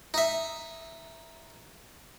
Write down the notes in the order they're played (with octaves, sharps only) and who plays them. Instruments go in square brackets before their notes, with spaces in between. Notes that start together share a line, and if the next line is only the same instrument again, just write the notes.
[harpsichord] D#4 E5